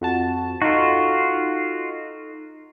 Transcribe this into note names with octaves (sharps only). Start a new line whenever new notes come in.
F2 F#4 A5
D#4 F4 F#4 A4